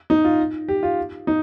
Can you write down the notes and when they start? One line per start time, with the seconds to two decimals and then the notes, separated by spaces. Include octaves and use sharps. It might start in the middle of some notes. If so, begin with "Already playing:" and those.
0.10 D#4
0.24 F4
0.68 G4
0.83 F4
1.27 D#4